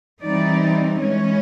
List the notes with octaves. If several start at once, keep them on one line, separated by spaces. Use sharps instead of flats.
E3 G3 C4 D#4 D5
E3 G#3 C#4